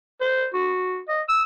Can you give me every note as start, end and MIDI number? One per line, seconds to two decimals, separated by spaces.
0.21 0.47 72
0.54 1.00 66
1.09 1.22 75
1.29 1.43 88